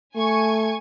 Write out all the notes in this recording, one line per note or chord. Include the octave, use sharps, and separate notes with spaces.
A3 G#5 C#6 G#6